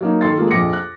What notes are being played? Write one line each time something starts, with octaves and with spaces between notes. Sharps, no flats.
F#3 A#3 D#4
D#3 A4 C6 A6
G#3 A#3 F4 A4
A#1 F2 D6 A#6 C#7
F#6